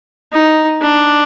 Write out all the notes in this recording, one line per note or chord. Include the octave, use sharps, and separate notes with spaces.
D#4
D4